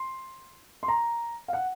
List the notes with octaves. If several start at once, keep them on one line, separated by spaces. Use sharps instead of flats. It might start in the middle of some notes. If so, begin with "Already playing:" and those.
Already playing: C6
C6
A#5
F5
F#5